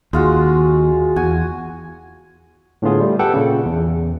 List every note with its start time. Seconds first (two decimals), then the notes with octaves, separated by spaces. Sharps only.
0.13 D#2 G#3 F4 F#4
1.16 E2 F#4 G#5
2.82 A2 D3 B3 F4 G#4
3.00 G3 A3
3.19 G4 A4 B4 F#5 G5
3.34 A#2 C#3
3.65 E2